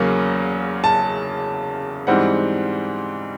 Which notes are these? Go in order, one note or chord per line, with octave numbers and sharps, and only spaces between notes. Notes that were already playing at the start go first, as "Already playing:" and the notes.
Already playing: E2 C#3 F#3 A#3 C#4
A5
G#2 E3 G3 C4 F#5